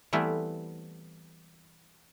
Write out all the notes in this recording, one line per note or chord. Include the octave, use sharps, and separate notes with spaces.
E3 G3 A3 B3 C4 E4